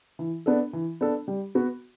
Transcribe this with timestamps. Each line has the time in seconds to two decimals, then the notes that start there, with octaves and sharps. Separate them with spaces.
0.19 E3
0.46 B3 D4 A4
0.73 E3
1.01 B3 D4 A4
1.28 G3
1.55 B3 F#4